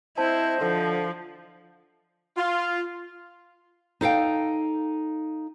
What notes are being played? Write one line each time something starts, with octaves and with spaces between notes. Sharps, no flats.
C4 E4 C5 D#5 A5 G6
D3 F3
F4
D#4 A4 F5 G5